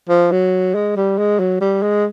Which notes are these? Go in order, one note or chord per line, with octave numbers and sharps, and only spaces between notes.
F3
F#3
G#3
G3
G#3
F#3
G3
G#3